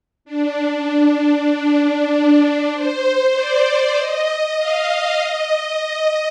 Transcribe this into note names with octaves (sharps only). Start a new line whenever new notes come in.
D4
D4
D4
C5
D5
D#5
F5
D#5